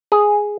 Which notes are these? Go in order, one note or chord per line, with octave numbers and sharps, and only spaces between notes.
G#4